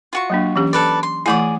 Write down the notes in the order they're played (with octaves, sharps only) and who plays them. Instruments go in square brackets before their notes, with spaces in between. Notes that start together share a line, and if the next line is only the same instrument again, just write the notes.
[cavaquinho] F4 F#4 C#6
[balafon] F#3 A#3 D4
E3 C#4 G4
[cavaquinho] A4 B4 D5
C6
[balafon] E3 A3 E4 [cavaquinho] G#4 D5 D#6